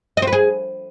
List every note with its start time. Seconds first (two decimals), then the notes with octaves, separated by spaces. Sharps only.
0.17 D#5
0.22 C4
0.27 B4
0.32 G#4